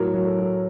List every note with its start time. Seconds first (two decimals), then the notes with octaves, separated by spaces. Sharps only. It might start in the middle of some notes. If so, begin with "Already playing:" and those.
Already playing: A2 F#3 A#4
0.14 F#3
0.26 A4
0.38 F#3